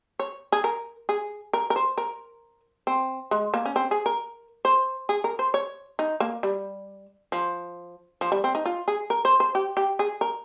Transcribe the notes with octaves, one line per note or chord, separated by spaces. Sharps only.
C#5
G#4
A#4
G#4
A#4
A#4
C5
A#4
C4
G#3
A#3
C#4
C4
G#4
A#4
C5
G#4
A#4
C5
C#5
D#4
A#3
G3
F3
F3
G3
C4
D#4
F4
G#4
A#4
C5
C5
G4
G4
G#4
A#4